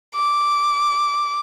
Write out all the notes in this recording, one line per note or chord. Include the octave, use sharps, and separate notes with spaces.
D6